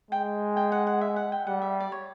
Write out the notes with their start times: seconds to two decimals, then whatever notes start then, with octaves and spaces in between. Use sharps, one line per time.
0.11 G#3 G5
0.57 G5
0.72 F#5
0.87 F#5
1.01 E5
1.16 F#5
1.32 G5
1.47 G3 F#5
1.62 E5
1.80 D5
1.92 C#5